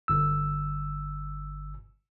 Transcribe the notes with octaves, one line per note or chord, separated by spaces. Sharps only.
G1 E6